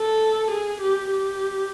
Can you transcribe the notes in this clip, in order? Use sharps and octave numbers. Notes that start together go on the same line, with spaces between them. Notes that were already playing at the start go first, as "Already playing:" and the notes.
Already playing: A4
G#4
G4
G4